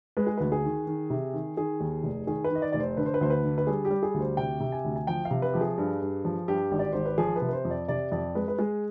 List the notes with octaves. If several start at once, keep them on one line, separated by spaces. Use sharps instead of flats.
G#3 B4
G#4
D2 B4
G#4
D#3
D#3
C3
D#3
D#3 G#4
D#2
F1
D#3 G#4
B4
D#3 D#5
D5
F1 D5
C5
D3 B4
C5
B4
D2 C5
B4
D3
B4
G3 G#4
G4
G3
G#4
D2
C5
C3 G5
C3
G#5
D2
G#5
F3 G5
F5
C3
B4
F3 G4
G#4
G2
G2
F3
G2 G4
G#1
D5
G#1 C5
B4
F3 G#4
B4
C3
B4
C5
F2
D5
C3 D5
F2 D5
G#3 B4
B4
G#3 G#4